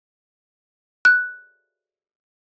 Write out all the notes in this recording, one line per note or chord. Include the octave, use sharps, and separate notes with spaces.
F#6